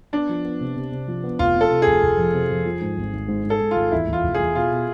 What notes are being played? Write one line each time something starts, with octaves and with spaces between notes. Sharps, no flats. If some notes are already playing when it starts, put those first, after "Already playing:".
B3 D4
F3
B3
C3
C3
C3
F3
B3
F1 F4
C3 A4
C3
F1 G#4
F1
F2
C3
F2
F3
G#2
G#1
G#1
G#2
G#2
A4
G#2
G#1 F4
E2 E4
E2 F4
F1
E2 G#4
B2 F4
B2